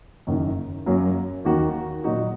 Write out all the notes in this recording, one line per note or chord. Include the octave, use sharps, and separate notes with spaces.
F#1 F#2 D#3 A#3
F#2 F#3 A#3
D#2 D#3 A#3 F#4
A#2 F#3 D#4 F#4